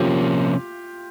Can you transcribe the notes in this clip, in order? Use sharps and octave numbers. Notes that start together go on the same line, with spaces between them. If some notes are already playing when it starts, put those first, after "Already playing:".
Already playing: C3 F3 A#3 C#4 F4 G4